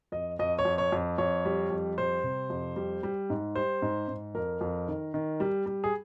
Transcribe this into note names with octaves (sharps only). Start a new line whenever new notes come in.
F2 D#5
F2 D#5
C#5
F2
C#5
F2
F2 C#5
G3
F2
G3 C5
C3
F2
G3
G3
G#2
G3 C5
G#2
G#2
F2 A#4
F2
D#3
D#3
G3
G3
G#4